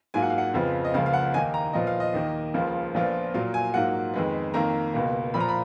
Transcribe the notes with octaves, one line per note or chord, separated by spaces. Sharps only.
G#2 F#3 A#3 F4 G#5
F#5
F5
F#5
F2 C#3 F3 B3
D#5
C#2 C#3 F3 A#3 F5
F5
F#5
D#2 D#3 A#3 D#4 G#5
A#5
A#2 F3 B3 F4 D#5
F5
D#5
D#2 D#3 A#3
C#2 C#3 F3 A#3
A#1 A#2 F3 B3 F4
A#2 F#3 A#3 F4 F5
G#5
G#2 F#3 A#3 F4 F#5
F2 D#3 G#3 B3
F2 D#3 A#3 A#5
C#2 B2 A#3
A#2 F3 A#3 B5
A#5
B5